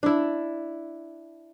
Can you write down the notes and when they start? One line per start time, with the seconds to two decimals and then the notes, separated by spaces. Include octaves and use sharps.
0.03 D4 E4